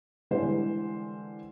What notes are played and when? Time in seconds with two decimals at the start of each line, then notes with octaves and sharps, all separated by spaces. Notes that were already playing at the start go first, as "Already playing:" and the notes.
0.31 D3 E3 G3 G#3 D4 C5